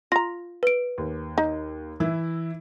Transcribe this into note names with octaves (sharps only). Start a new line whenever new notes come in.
F4 A#5 A#6
B4 D7
D#2
D#4
E3 E4